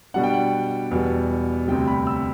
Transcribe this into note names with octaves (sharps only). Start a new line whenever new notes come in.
B2 G3 D4 F#5
G5
F#5
E2 B2 G3
D2 C3 G3 G5
B5
E6